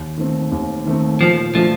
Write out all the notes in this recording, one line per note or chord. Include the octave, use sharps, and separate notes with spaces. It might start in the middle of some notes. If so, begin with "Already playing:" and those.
Already playing: D#2
D#3 A3 C4
D#2
D#3 A3 C4
A#2 F3
F3 A3 D4 F4